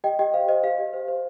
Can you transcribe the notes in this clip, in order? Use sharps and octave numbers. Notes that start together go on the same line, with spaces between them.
G4 D#5 G5
G4 D#5 G5
C5 F5
C5 D#5
G4 F5
G4
C5
C5